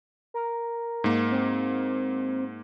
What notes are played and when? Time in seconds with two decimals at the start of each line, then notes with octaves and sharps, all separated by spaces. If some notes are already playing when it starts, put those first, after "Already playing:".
0.34 A#4
1.04 G#2 A#3
1.31 C4